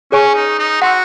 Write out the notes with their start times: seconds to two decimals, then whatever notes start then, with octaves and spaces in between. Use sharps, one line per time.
0.12 C#4 G#4 C#5 G#5 C#6
0.35 D#4
0.59 D#4
0.82 F#4 F#5 C6 E6